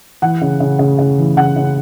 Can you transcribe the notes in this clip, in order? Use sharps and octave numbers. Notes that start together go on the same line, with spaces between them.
E3 F#5
C#3
C#3
C#3
C#3
E3
C#3 F#5
C#3